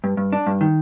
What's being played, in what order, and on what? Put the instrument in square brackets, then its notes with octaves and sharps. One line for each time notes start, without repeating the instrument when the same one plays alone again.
[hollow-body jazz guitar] G2
G2
D4
G2
D#3